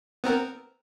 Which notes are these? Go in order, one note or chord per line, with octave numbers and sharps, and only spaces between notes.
B3 C4 A#4